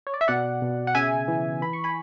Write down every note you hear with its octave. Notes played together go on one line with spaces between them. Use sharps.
C#5
D5
E5
B2 D5 F#5
B2
F#5
C#3 E5 G#5
E3
E3 B5
C#6
G#5 B5